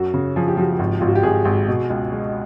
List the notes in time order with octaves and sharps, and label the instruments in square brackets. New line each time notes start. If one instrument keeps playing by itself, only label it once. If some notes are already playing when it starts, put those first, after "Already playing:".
Already playing: [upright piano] F#2 F#4
C#3
F3 G#4
G4
F3 F#4
G4
G#1
G#1 F4
F#4
G4
G#1 G#4
G#1
B2
C#2
G#3